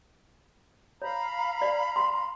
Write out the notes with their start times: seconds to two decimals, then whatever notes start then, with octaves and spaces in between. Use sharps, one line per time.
1.02 C#5 F5 A#5 B5
1.62 D5
1.96 C6